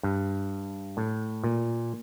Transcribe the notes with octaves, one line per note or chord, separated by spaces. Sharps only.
G2
A2
A#2